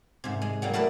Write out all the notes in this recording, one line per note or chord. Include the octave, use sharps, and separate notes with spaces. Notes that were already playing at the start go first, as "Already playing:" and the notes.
G#2 C3
G#3
F#3 G3 A#3
A3 E4 A#4 B4 D5 E5